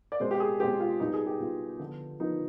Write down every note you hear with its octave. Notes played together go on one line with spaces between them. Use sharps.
D5
B2 G#3 C4 C5
G4
G#4
B2 G#3 C4 G4
F4
B2 G3 B3 D#4
G#4
G4
B2 G3 B3 F4
D3 F3 B3
D3 F3 B3 D#4